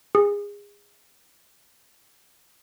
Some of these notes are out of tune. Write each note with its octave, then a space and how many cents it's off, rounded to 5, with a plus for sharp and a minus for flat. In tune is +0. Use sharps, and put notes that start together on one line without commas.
G#4 -25